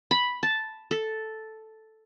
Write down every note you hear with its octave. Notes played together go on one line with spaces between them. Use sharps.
B5
A5
A4